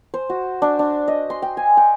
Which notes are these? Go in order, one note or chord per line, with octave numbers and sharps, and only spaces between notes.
C5
F#4
D4
D4
D#5
C6
G5
G#5
G5